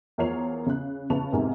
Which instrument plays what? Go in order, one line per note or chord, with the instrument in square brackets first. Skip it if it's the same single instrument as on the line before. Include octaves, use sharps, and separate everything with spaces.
[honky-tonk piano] E2 F3 A#4 C#5 C7 F7
C#3 F#6
C#3 B4 A5 C#6 F7
E2 G#2 C3 A#4 G#5